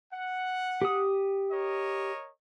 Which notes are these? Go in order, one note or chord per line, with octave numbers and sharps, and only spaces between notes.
F#5
G4 D#6
A#4 C#5 D#5